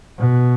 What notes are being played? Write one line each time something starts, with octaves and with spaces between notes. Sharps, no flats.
B2